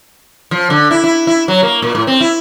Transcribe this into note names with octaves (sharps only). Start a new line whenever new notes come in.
F3
D3
E4
E4
E4
F#3
A#3
A#2
A2
C4
E4